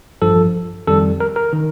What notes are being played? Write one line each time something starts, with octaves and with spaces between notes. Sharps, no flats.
A1 G2 F3 A4
F2 D#3 G3 A4
A#4
A#4
D#3